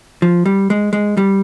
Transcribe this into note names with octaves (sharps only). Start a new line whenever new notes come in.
F3
G3
G#3
G#3
G3